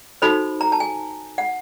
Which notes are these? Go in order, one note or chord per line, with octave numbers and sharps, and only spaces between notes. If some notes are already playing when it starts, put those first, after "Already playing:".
D#4 F#4 A4 C5 B5
A#5
A5
G#5
F#5